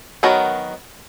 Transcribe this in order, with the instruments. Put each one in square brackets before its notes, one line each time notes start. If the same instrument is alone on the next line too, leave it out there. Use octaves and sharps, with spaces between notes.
[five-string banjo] D#3 F#3 B3 F#4 A#4